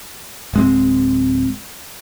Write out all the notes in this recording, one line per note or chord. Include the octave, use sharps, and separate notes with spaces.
D1 G#3 C4